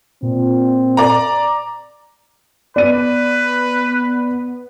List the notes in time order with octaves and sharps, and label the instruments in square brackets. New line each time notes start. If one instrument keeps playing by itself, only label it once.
[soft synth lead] A#2 [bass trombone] C4
[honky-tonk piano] D5 A#5
[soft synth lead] B3 [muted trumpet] B4 [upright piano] D5 D#7